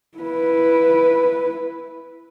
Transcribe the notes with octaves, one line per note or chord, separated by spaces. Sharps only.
E4 B4